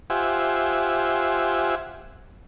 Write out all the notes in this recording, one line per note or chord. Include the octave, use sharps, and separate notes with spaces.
F4 G4 C5 E5 F#5 G#5